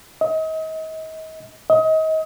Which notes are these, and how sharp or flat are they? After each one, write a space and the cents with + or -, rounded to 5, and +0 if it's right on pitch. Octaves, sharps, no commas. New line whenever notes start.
D#5 +35
D#5 +30